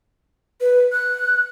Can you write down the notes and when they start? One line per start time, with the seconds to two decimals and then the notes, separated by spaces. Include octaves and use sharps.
0.61 B4
0.92 F#6